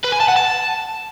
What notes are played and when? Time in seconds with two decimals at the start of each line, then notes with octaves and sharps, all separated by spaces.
0.04 B4
0.12 G#5
0.20 A5
0.28 F#5
0.36 A5